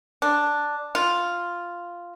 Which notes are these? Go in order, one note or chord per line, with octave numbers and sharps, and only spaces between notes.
D4
F4